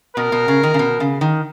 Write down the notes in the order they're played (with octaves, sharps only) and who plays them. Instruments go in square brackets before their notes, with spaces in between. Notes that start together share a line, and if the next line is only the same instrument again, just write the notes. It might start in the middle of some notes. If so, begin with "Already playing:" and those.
[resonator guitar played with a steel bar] B2 [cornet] A#4
[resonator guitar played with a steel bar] B2
C#3
D#3
C#3
B2
C#3
D#3